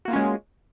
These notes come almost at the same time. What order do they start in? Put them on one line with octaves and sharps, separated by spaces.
F#4 A#3 F4 C#4 G#3